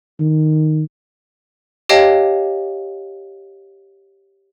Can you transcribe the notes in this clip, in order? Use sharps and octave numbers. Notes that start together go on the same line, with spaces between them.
D#3
G4 C#5 D#5 F5 G5 A5